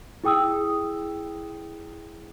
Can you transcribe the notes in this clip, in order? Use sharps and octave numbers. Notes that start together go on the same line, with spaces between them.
E4 G#4 G5 D#6 E6